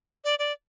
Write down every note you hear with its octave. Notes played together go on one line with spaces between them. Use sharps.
D5
D5